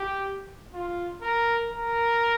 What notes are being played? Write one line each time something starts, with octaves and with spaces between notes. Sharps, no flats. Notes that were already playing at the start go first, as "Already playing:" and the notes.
Already playing: G4
F4
A#4
A#4